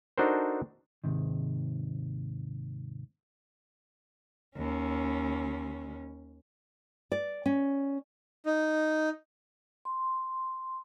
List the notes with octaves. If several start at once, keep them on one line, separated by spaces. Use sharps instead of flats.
D4 D#4 F#4 A4 A#4 C5
D#2 G#2 C3 D#3
D#2 C#4
D5
C#4
D#4
C6